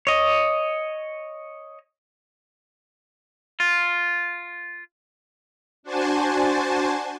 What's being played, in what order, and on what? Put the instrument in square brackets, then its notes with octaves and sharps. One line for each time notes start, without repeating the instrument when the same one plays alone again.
[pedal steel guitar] C#5 D#5
[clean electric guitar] F4
[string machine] D4 F#4 C5 G#5 A5